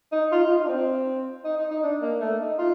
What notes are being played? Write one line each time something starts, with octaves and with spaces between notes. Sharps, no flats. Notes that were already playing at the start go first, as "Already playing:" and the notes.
D#4
F4
F4
D#4
D4
C4
D#4
D#4
D#4
D4
A#3
A3
D#4
F4